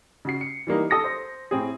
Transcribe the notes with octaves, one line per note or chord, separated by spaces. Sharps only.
C#3 F#4 C7
C#7
E3 G3 A#3 D#4
A4 D#6 A#6 C#7
C5
A2 C4 G#4